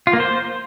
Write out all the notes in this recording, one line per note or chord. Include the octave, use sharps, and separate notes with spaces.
F4
A#3
C5